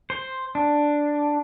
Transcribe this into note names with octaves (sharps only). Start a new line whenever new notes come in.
C5
D4